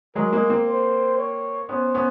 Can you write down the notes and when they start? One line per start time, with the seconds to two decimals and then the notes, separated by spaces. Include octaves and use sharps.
0.15 F#3 G#3 A#4
0.33 G#3 A#3
0.50 A#3 C4
0.67 C5
1.18 C#5
1.69 B3 C#4 C5
1.94 B3 C#4